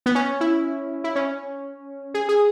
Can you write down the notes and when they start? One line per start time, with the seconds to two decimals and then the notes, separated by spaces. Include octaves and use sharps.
0.06 B3
0.15 C#4
0.41 E4
1.04 E4
1.16 C#4
2.14 G#4
2.29 G#4